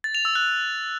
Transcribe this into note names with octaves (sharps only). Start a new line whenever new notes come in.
A6
F7
E6
F#6